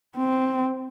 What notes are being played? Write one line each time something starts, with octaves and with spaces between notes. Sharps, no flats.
C4